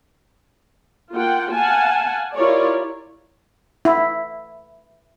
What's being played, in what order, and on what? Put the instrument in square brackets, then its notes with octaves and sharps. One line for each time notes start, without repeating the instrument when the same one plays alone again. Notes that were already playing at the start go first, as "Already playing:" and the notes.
[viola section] A#3 F4 F#5 G5
F5 F#5 G#5 A5
E4 F4 G4 A#4 C#5 D5
[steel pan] E4